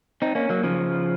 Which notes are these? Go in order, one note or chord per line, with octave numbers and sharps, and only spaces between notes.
C4 D#4
A#3 C#4
F#3 A#3
C#3 F3